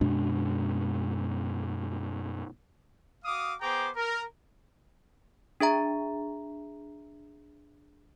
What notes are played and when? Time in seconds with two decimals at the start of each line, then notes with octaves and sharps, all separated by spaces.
0.01 F#2 B2 G#3 D4
3.25 F#4 F5 D6 D#6
3.62 B3 G#4 C5 G5 A#5 D6
3.97 A#4
5.60 D4 G#4 E5 A#5